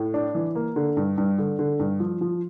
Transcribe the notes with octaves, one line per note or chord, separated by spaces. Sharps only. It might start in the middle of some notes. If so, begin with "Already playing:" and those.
Already playing: A2
D4
E3
A#3
D3
G2
G2
D3
D3
G2
F3
F3